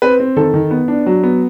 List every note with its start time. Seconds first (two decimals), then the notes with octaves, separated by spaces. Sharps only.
0.02 C4 B4
0.20 C4
0.37 D#3 A4
0.54 D#3
0.71 B3
0.88 D4
1.06 F#3
1.23 B3